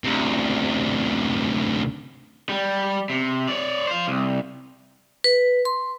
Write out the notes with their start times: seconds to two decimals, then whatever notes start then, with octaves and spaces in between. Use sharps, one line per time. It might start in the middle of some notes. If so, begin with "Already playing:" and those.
0.04 D2 C3
2.49 G3
3.10 C3
3.48 C#5 D5
3.87 C5 F5
4.08 C2
5.24 B4
5.65 C6